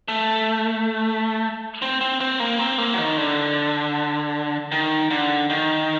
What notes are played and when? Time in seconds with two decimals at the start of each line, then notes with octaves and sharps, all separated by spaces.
0.08 A3
1.82 C4
2.01 C4
2.20 C4
2.40 A#3
2.59 C4
2.78 A#3
2.94 F#3
2.99 D#3
3.17 D3
4.72 D#3
5.10 D3
5.50 D#3